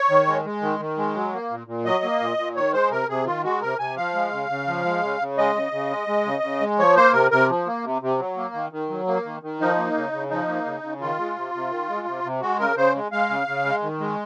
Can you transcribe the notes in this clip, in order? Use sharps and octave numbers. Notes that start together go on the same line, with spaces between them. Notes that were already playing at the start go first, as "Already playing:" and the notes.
Already playing: C#5
D#3
G#3
G#3
D#3
D#3
G#3
F#3
A#3
A#2
A#2
F#3 D#5
A#3
A#2
A#2
D#3 C#5
G#3 C5
C3 A#4
C3 G#4
D#3 F4
G#3 F#4
C3 A#4
C3 G#5
F3 F5
G#3
C#3
C#3
F3
G#3
C#3
C#3
G#3 D#5
C#3
C#3
G#3
G#3
C#3
C#3
G#3
F3 C#5
A#3 C5
C3 A#4
C3 A#4
F3
A#3
C3
C3
F#3
A#3
D#3
D#3
F#3
A#3
D#3
D#3
F3 D#4
A#3
C#3
C#3
F3 D#4
A#3
C#3
C#3
D#3 F4
G#3
C3
C3
D#3
G#3
C3
C3
G#3 F#4
C#3 A#4
C#3 C5
G#3
G#3 F5
C#3
C#3
G#3
D#3
G#3